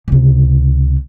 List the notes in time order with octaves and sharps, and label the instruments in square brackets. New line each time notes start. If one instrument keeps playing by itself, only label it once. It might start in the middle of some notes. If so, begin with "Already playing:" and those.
[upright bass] C#2 C3